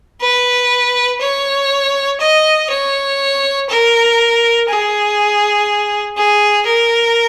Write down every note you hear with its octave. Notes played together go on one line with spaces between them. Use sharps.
B4
C#5
D#5
C#5
A#4
G#4
G#4
A#4